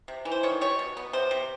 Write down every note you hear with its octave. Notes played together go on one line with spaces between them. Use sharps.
C3
E3
C5
D#3 C#5
G3 C#5
B2
B3
C3 C5
C3